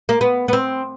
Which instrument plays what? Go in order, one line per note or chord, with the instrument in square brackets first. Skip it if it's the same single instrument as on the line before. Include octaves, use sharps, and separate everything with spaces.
[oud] A#3
B3
B3
C4